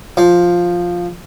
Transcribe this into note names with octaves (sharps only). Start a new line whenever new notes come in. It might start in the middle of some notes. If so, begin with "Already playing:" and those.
F3